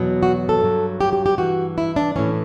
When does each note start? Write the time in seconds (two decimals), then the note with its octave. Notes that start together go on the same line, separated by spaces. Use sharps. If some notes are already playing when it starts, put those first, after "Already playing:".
Already playing: E2 B2 F#3
0.23 F#4
0.49 A4
0.61 G2 F#3
1.01 G4
1.13 G4
1.26 G4
1.38 G2 E3 F#4
1.78 E4
1.96 D4
2.16 A2 E3 C#4